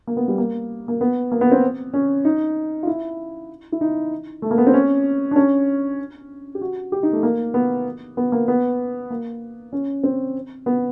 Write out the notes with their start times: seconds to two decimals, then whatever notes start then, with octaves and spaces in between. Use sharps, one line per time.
0.07 A#3
0.17 B3
0.28 G3
0.38 A#3
0.88 A#3
1.01 B3
1.32 A#3
1.41 B3
1.52 C4
1.94 C#4
2.25 D#4
2.83 F4
2.87 E4
3.72 E4
3.81 D#4
4.42 A3
4.51 A#3
4.58 B3
4.67 C4
4.74 C#4
5.31 D4
5.36 C#4
6.55 G4
6.61 F#4
6.92 G4
7.03 D#4
7.13 A3
7.23 A#3
7.54 B3
8.17 B3
8.32 A#3
8.48 B3
9.10 A#3
9.73 C#4
10.04 C4
10.66 B3